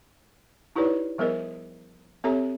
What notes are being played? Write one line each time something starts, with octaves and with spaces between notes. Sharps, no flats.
D#4 E4 G4 B4 C#5 D5
F3 G3 B3 G#4 A#4 D#5
C4 G4 A4 C#5 E5 A#5